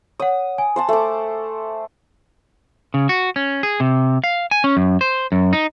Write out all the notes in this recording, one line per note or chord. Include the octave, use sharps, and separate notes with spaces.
C#5 F#5 D#6
G#5
C5 F#5 A5
A3 D6
C#3
F#4
C#4
G#4
C3
F5
G#5
C#4
F#2
C5
F#2
D#4